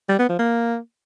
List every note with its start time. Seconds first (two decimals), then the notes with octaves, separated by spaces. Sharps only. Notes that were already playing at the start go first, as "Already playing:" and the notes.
0.09 G3
0.19 B3
0.29 F3
0.39 A#3